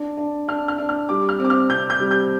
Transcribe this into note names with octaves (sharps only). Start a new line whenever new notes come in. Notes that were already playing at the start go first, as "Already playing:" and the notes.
Already playing: D4
D4
D4 F6
F6
D4
F6
G3 D6
F6
C4 D6
F6
C3 G6
G6
G3
G6